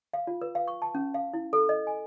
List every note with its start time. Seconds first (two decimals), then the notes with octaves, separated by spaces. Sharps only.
0.13 F5
0.27 F4
0.42 B4
0.55 F5
0.68 C#6
0.82 A5
0.95 C#4
1.14 F5
1.34 E4
1.53 A4
1.69 D#5
1.87 G#5